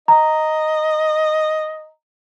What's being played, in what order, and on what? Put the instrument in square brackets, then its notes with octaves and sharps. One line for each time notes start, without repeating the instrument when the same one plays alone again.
[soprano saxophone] D#5 [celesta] A#5